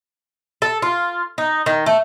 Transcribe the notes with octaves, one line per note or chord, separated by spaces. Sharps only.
A4
F4
D#4
D#3
A3